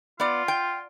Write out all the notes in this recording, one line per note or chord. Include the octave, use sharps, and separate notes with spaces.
B3 F4 D5
G5